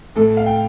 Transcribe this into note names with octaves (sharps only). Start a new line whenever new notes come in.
A2 A4
F5
G5